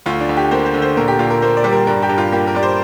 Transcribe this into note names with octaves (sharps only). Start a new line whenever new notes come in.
D2 F4
D4
D2
G4
A#3 C5
C5
D3
C5
A#2 A#4
G4
A#2 F4
A#4
A#3 C5
D5
G3
A#4
G2 A#4
G4
G2
F4
A#3 G4
A#4
G3 D5
C5